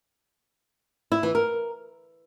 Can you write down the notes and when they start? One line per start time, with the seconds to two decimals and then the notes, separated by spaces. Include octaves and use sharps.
1.12 E4
1.23 E3
1.35 A#4